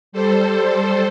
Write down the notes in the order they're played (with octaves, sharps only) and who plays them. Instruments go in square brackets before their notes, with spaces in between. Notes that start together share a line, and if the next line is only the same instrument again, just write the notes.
[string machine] G3 A4 C5